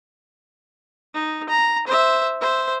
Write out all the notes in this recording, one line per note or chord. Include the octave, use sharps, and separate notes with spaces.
D#4
A#5
C5 E5
C5 E5